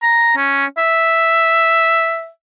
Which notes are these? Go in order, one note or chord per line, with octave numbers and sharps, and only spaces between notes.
A#5
C#4
E5